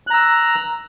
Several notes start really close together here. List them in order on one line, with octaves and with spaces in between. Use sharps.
F#6 A#5 E6